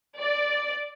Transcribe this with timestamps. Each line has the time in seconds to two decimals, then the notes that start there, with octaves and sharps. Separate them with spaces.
0.18 D5